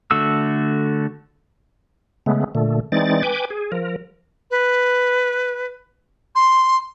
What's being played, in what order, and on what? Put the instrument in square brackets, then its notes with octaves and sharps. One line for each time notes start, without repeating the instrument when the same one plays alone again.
[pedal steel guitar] D3 A3 F#4 E6
[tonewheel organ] C#3 G#3 A3 B3
A#2 D3 A3
E3 G#3 C4 D#4 D5 A6
B4 G5 G#5 D6
G#4
F3 A#4
[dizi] B4
C6